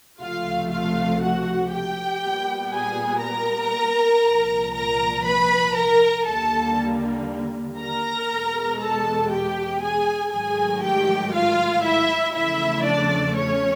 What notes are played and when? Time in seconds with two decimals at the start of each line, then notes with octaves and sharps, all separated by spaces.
0.20 C#2 C3 F3 A3 F4 F5
0.71 F4 F5
1.21 F#4 F#5
1.72 G4 G5
2.22 A#2 G3 B3
2.72 G#4 G#5
3.23 A#4 A#5
4.25 C2 A#2 F3
4.75 A#4 A#5
5.26 B4 B5
5.77 A#4 A#5
6.27 D#2 D3 G3 A#3 A4 A5
7.78 A#4 A#5
8.29 E2 B2 G#3
8.80 A4 A5
9.30 G4 G5
9.82 G#4 G#5
10.32 G#2 D#3 F#3 A3 G#4 G#5
10.83 G4 G5
11.33 F4 F5
11.84 E4 E5
12.34 E2 C#3 F3 A3 E4 E5
12.85 D4 D5
13.36 C#4 C#5